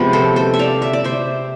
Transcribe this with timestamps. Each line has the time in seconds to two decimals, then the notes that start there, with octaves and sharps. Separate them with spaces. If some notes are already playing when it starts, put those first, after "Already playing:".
Already playing: C3 F3 G#3 B3
0.13 A4 C5
0.36 A4 C5
0.54 E5
0.59 D5 F5
0.82 E5
0.93 D5
1.04 C5 E5